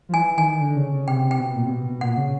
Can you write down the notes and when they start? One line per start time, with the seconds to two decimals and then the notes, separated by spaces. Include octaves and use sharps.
0.09 F3
0.13 E3 G#5
0.37 D#3 G#5
0.61 D3
0.76 C#3
0.92 C#3
1.08 C3 G5
1.24 C3
1.31 G5
1.40 B2
1.55 A#2
1.65 C3
1.70 B2
1.87 B2
2.01 A#2 F#5
2.17 C#3